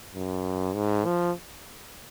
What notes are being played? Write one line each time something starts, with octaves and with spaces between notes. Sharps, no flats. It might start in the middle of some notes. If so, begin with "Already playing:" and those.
F#2
G#2
F3